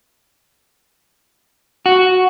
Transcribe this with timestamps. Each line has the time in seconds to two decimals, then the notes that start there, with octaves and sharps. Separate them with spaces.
1.86 F#4